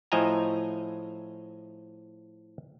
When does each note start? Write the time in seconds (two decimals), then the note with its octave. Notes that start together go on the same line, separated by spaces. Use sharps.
0.12 A2 F3 D#5 E5 G#5 A#5